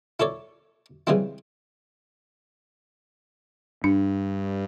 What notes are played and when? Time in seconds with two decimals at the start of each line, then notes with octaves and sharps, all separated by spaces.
0.20 E4 A4 C#5 D5
1.07 C#3 E3 G3 G#3 C4 E4
3.84 G2 D4